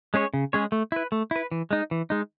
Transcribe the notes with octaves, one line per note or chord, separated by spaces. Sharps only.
G#3 C#4 G#4 C#5
C#3
G#3 C#4 G#4 C#5
A3
E4 B4
A3
E4 B4
E3
G#3 D#4
E3
G#3 D#4